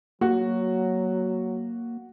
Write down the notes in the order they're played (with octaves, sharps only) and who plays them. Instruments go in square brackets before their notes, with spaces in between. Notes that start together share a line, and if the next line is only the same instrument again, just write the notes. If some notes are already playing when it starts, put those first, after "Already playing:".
[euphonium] F#3 [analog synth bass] A#3 [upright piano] F#4